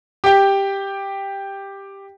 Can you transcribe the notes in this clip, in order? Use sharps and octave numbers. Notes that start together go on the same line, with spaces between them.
G4 G5